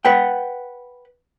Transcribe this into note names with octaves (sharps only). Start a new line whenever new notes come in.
B4 F#5 G5